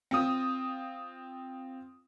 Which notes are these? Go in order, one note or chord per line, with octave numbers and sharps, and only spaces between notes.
C4 F4 D#6